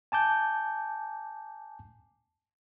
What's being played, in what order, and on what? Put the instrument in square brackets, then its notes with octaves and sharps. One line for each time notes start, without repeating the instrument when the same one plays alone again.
[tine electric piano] G#5 A5 D6 G6